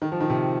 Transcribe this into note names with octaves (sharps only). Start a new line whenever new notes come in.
D#3
F3
D#3
C3